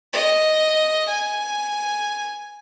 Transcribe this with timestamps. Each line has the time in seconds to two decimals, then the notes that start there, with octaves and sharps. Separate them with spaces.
0.13 D#5
1.08 G#5